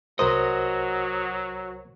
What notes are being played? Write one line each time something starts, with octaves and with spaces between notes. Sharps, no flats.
C2 F#3 F#4 A#4 C5 D#5